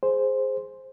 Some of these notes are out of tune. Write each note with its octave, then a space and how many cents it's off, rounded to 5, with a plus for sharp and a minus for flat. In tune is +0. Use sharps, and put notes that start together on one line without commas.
G#4 +0 C5 +0